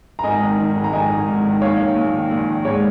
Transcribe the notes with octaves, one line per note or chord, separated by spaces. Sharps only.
A#5
G#1 D#5 G#5
D#3
D#3
G#1
A#5
D#3 D#5 G#5
G#1
G#1
D#3
A#1 C#5 F5
D#3
A#1
D#3
A#1
D#3
G#2 C#5